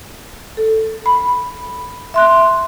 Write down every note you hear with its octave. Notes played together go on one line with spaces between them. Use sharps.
A4
B5
E5 C6 F#6